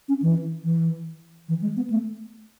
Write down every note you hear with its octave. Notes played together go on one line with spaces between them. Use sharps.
C#4
E3
E3
E3
G#3
B3
A3